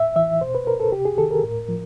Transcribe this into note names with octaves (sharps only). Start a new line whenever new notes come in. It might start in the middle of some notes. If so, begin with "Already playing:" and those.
Already playing: A2 E5
E3 E5
B2 C5
B4
A#4
A4
C3 G4
G#4
D#3 A4
A#4
A2
F3